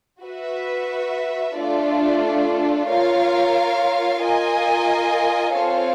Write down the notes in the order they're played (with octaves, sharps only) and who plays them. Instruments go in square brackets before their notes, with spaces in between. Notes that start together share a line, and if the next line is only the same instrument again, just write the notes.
[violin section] F#4 B4 E5
A3 D4 F4 A4 D5
F4 A#4 C#5 F5
F4 A#4 D#5 G#5
C4 F4 A4 C#5 F5